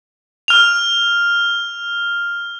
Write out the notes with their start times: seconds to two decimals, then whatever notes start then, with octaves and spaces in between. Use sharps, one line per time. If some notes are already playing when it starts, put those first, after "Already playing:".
0.48 F6 F7